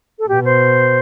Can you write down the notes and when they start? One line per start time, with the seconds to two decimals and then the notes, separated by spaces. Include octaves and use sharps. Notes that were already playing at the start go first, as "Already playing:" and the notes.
0.19 A4
0.29 B2 G4
0.45 C5